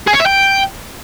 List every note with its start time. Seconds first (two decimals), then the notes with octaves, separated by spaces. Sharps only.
0.08 G#4
0.14 C#5
0.20 E5
0.27 G5